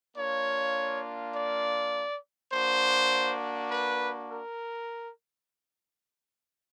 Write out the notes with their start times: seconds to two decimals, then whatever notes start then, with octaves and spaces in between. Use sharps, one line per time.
0.17 A#3 D4 F4 C#5
1.35 D5
2.53 A#3 D4 F#4 C5
3.71 B4
4.30 A#4